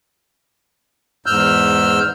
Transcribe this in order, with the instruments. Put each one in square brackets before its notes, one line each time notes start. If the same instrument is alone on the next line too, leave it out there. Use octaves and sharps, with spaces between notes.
[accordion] E2 G#2 E6 F6 G6